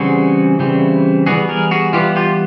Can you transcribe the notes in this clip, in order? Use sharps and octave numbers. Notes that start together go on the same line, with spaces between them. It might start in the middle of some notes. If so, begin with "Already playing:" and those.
Already playing: C#3 E3 G3 C4 F#4 G#4
C#3 E3 G3 C4
E3 G3 B3 F#4 G#4
G#4 A#4
F#4 G#4
E3 G3 B3 F4 G4
F4 G4